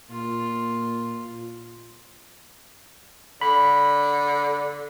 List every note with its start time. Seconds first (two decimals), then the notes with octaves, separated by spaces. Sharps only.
0.10 A#2 F4
3.41 D3 B5